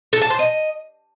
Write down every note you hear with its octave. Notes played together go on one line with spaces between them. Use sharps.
A4
A5
C5
D#5